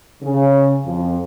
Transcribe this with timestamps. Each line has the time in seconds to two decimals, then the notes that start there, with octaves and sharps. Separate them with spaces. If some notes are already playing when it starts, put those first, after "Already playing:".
0.22 C#3
0.85 F2